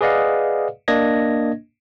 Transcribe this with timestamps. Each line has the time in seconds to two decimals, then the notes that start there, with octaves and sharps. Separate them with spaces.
0.01 G#4 B4 D5 D#5 F5 F#5
0.88 A#3 D4 D#5 G#6 A#6